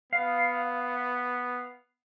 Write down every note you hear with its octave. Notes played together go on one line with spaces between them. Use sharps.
B3 F5